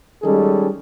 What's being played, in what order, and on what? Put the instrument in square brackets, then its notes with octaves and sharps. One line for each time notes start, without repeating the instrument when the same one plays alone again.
[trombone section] D#3 G3 G#3 C#4 G#4 A4